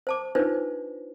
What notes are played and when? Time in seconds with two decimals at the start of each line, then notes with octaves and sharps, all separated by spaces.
0.07 C5 A5 D6
0.35 D4 D#4 F4 B4 C5